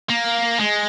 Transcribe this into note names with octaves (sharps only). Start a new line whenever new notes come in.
A#3
G#3